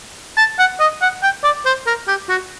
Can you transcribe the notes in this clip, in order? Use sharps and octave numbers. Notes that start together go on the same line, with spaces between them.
A5
F#5
D#5
F#5
G5
D5
C5
A#4
G4
F#4